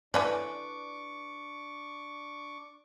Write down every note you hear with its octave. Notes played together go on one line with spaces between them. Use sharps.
E3 A3 C#4 D4 B4 D5 C#6 D6